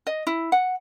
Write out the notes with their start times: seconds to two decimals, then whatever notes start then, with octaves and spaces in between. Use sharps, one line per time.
0.07 D#5
0.27 E4
0.52 F#5